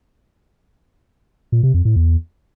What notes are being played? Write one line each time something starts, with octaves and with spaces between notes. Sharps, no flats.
A#2
C3
F2
A2
E2